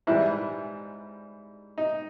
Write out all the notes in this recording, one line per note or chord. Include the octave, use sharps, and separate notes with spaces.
G#2 E3 G3 E4
D#4